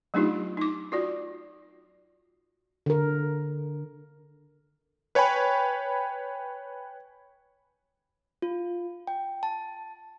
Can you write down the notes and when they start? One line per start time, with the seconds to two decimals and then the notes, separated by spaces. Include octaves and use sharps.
0.14 F#3 A3 D4 D#4 F4 G4
0.57 D#4 D6
0.92 F4 F#4 D5
2.86 D3 A#4
5.15 B4 C#5 G5 G#5 B5
8.42 F4
9.07 G5
9.43 A5